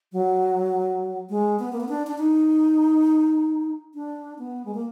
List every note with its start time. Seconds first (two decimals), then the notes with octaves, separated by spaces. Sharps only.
0.13 F#3
1.30 G#3
1.59 B3
1.73 A#3
1.80 B3
1.89 D4
2.07 D4
2.18 D#4
3.94 D4
4.39 B3
4.65 G#3
4.74 A#3